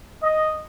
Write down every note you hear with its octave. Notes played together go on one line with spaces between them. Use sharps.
D#5